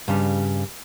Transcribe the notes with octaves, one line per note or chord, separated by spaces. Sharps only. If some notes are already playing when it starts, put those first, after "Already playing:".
G2 C#3 G3